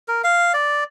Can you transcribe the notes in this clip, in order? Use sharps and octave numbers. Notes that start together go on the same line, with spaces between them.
A#4
F5
D5